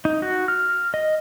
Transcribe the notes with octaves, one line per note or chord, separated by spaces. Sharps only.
D#4
F#4
F6
D#5